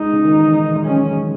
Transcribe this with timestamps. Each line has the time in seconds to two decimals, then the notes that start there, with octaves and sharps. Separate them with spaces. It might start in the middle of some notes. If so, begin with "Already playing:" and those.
Already playing: G#3 D#4
0.13 C#3
0.25 D#3
0.38 E3
0.76 G#3
0.84 F#3 C#4